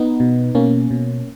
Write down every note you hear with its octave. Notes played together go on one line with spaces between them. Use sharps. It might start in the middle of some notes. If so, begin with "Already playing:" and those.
Already playing: B3 D#4
B2
B2 A#3 C#4
B2